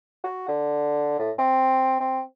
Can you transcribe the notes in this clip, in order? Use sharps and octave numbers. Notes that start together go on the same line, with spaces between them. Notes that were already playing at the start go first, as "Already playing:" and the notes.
F#4
D3
A2
C4
C4